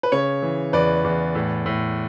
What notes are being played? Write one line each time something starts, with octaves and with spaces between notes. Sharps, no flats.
B4
C#3 C#5
E3
E2 B4 D5
E2
A2
A2